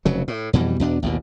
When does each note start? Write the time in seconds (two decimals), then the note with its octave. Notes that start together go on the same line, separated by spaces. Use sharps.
0.05 F1 C#3 F#3
0.28 A2
0.53 F2 B2 E3 G3
0.80 E2 B2 D4
1.02 A1 D#2 B2